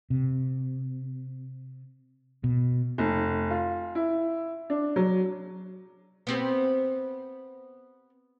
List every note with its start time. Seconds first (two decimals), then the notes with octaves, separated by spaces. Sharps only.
0.10 C3
2.44 B2
2.98 F1
3.51 F4
3.95 E4
4.70 D4
4.96 F#3
6.27 B3 C4 G4